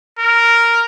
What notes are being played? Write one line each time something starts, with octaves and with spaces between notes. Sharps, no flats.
A#4